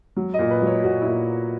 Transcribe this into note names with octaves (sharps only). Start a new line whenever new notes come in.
F#3
D#5
A#2
B4
F#3 C#5
A#2 F#4
A#2 E4